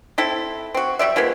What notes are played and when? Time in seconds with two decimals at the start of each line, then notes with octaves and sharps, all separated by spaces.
0.18 C4 E4 A4
0.74 C4 F#4
0.99 F#3 G3 D5 E5
1.16 F3 G#3 A#3 B3